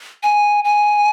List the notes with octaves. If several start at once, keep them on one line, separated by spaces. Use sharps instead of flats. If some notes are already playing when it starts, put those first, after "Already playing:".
G#5
G#5